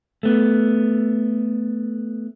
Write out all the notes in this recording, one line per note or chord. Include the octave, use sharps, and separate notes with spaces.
A3 B3